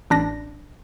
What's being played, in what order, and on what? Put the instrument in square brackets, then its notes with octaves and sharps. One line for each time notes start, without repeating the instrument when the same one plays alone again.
[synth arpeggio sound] A1 D4 A#6